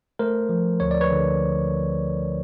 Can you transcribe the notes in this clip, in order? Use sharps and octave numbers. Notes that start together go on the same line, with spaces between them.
A3 A#4 C5
F3
D2 C#5
D5
B4 C#5
D3